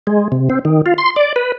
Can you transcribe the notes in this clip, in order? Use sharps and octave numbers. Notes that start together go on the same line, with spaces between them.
G#3
C3
C4
D#3
F4
C6
D5
B4